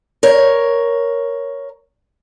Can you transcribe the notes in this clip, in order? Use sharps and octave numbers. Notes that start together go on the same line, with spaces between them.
A#4 C#5